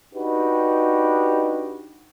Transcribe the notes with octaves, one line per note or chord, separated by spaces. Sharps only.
D4 D#4 F#4 G4 B4